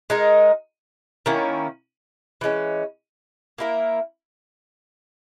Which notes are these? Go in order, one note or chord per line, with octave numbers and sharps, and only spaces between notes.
G#3 D#4 A#4
D#3 A#3 C#4 E4
E3 G#3 C#4
A#3 E4 A#4